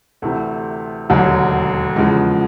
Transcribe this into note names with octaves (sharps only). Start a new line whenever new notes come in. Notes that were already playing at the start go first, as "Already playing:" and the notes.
D2 C3 E3 A3
E1 D#2 D3 F#3
E2 C#3 F3 G#3